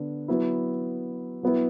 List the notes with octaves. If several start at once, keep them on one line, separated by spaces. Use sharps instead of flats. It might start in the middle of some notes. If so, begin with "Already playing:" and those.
Already playing: D3 B3 D4
F#3 B3 E4
F#3 B3 E4